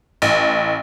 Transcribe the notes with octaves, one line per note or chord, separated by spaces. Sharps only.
A1